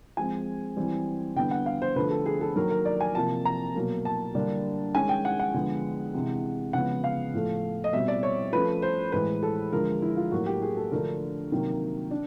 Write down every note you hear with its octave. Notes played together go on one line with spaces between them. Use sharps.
F3 G#3 C4 G#5
E3 G3 C4
D3 G3 B3 D4 G5
F#5
F5
C5
D3 F3 A3 B4
A4
G#4
A4
D#3 F#3 A#3 A#4
A#4
D5
G#5
C3 F3 A#3 A5
A#5
B2 F#3 A#3
A5
D3 G3 A#3 D4
D#3 G#3 C#4 G#5
G5
F#5
F#5
D3 F3 G#3 B3
C3 E3 G#3
C#3 F3 G#3 B3 F#5
F5
A2 F3 A3
D#5
B2 G3 C4 E5
D5
C#5
F3 A3 C#4 B4
C5
A2 E3 G#3 B4
A4
D3 F3 G#3 A#4
E4
F4
A2 F#3 A#3 F#4
G4
G#4
A4
D3 F3 A3 D4 A#4
C3 D#3 F#3 A#3
D4